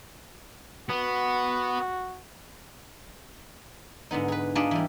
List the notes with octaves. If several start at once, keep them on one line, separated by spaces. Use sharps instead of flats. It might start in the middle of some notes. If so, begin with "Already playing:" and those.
B3 F#4
G#2 D3 B3 D#4
G#4 B4
D4 D#4 F4 G#4 D5 B5
E3 G3